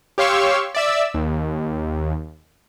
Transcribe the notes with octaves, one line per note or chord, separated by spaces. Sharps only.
G4 C#5 F5 C6 C#6 E6
D5 E5 E6
D#2